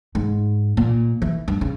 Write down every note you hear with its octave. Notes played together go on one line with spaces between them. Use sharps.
G#2
A#2
E3
G2
C#3